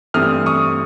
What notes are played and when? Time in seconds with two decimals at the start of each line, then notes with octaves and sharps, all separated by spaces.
0.14 G2 E3 A3 C4 D#6 F6
0.46 C#6 D#6